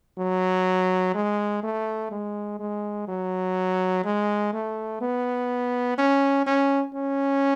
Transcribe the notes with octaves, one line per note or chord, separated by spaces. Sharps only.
F#3
G#3
A3
G#3
G#3
F#3
G#3
A3
B3
C#4
C#4
C#4